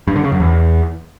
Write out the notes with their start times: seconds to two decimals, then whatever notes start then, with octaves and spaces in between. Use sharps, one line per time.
0.08 G2
0.16 D3
0.24 C#3
0.32 F#2
0.40 E2